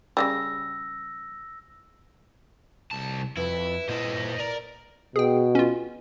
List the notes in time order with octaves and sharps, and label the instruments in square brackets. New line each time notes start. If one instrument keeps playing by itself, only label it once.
[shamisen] C#3 E3 G3 [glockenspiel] E6 A#6
[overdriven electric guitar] C2 A5
[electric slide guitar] F2 [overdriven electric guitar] E4 [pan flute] B4
[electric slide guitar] A#2 E4 [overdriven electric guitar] C5 D#5
[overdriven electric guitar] A#4 [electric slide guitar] D5
[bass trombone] B2 [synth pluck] G#4 G5
[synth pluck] C#4 F4